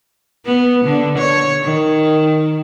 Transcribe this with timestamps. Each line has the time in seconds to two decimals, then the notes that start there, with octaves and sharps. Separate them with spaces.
0.46 B3
0.85 D3
1.18 C#5
1.63 D#3